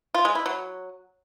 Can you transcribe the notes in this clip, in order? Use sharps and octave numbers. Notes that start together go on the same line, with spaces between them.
F4
G#3
E4
F#3